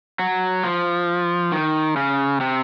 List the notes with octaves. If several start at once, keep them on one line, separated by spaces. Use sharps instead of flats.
F#3
F3
D#3
C#3
C3